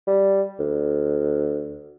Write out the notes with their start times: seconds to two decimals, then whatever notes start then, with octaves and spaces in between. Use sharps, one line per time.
0.07 G3
0.60 D2